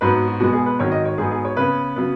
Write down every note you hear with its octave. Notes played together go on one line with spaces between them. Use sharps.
G#2 F#3 B3 B4
F#4
B2 G#3 B3 F#4
G#4
B4
G#2 D#3 F#3 C#5
D#5
C#5
G#2 F#3 B3 G#4
G#4
C#5
C#3 B3 B4
C#3 F#3 B3